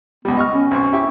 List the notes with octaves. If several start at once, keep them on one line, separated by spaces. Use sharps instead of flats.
C#2 G3 B3
D#5 C#6 F6
C#4
B1 C4 C#6
E4 G4 C#6